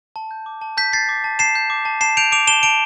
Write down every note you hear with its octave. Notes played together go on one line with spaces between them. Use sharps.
A5
G6
D6
A5
A5 G6 B6
G6 A6 C7
D6
A5
A5 C7 E7
G6
D6
A5
A5 C7 E7
G6 D7 F7
D6 D7 F7
A5 E7 G7
A5 D7 F7